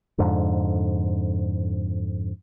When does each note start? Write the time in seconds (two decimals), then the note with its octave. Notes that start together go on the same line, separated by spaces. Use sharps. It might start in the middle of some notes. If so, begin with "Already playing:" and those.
0.18 F2 G#2 D3